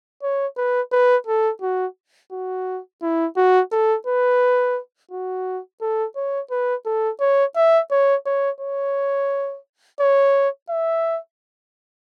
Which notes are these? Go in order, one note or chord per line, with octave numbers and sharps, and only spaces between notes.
C#5
B4
B4
A4
F#4
F#4
E4
F#4
A4
B4
F#4
A4
C#5
B4
A4
C#5
E5
C#5
C#5
C#5
C#5
E5